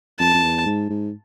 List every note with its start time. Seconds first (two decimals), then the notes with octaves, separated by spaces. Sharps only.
0.19 F2 A5
0.34 F2
0.43 E2
0.66 G#2
0.90 G#2